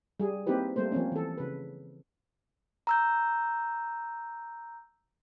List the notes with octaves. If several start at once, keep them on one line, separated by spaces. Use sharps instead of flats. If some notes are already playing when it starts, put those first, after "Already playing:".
G3 G#4
A#3 C4 D#4 E4 G4 B4
G3 A3 A#3 C5
F3 A#3 C4 C#4
E3 A4
C#3 B4
A#5 E6 G6